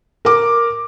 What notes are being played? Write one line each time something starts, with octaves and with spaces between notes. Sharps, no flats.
A#4 D6